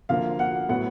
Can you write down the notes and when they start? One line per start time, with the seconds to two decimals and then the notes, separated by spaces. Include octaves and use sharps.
0.09 D3 F3 A#3 F5
0.39 F#5
0.69 A2 F#3 B3 F#5